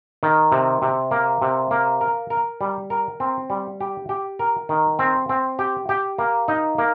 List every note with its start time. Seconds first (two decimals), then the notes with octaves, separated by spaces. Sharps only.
0.23 D#3
0.52 C3
0.82 C3
1.11 A#3
1.42 C3
1.71 A#3
2.01 A#4
2.30 A#4
2.61 G3
2.90 A#4
3.20 C4
3.50 G3
3.80 G4
4.09 G4
4.39 A#4
4.69 D#3
4.99 C4
5.29 C4
5.59 G4
5.89 G4
6.19 A#3
6.48 D#4
6.78 A#3